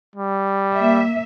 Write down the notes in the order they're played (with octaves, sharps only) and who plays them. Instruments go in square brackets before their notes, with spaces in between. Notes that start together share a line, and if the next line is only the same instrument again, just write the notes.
[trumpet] G3
[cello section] A#3 E5